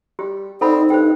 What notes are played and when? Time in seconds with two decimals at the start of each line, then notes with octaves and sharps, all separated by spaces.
0.19 G3 G4
0.61 C4 D#4 A4 D5 F#5 B5
0.90 G2 A4 C5 G5